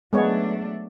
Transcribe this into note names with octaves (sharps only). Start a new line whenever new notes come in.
F#3 G#3 A3 B3 D4 C#5